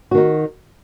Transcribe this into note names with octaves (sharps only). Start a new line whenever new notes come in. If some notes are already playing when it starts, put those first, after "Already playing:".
D#3 D#4 F#4